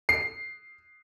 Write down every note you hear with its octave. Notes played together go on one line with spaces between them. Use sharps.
C7